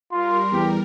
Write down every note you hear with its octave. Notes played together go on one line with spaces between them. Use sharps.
G3 F4 A#4 C6
E2 G4